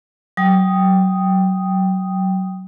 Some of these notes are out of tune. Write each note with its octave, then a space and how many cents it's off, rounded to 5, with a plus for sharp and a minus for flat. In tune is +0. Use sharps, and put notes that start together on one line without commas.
F#3 +20 G5 +5 D#6 +0